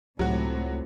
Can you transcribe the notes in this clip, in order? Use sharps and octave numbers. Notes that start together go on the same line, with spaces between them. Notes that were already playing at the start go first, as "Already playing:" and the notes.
C#2 A2 C3 F#3 F#4